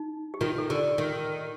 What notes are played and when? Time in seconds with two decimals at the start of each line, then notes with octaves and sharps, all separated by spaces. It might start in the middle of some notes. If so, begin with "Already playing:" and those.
Already playing: D#4
0.34 G4
0.41 D#3 F4
0.58 A4
0.70 D3 G4
0.98 D#3